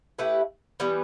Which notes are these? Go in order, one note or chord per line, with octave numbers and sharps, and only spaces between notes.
A3 E4 G4 B4
E3 G3 B3